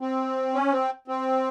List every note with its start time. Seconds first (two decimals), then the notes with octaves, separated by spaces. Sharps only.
0.01 C4
0.54 C#4
0.71 C4
1.08 C4